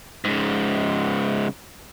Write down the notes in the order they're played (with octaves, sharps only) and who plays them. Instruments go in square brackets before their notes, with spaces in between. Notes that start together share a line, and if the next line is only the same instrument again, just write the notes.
[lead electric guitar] G#2 C#3